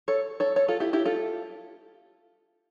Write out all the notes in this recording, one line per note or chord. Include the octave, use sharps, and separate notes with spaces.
A4 C#5
A4 C#5
A4 C#5
F4 A4
E4 G4
E4 G4
F4 A4